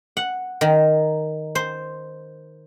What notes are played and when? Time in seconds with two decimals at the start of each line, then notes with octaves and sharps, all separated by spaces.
0.17 F#5
0.61 D#3
1.55 C5